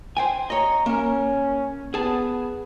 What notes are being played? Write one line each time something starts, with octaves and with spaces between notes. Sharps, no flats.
C5 G5 G#5
C#5 D#5 A#5
A#3 C#4 A#4
B3 G#4 A5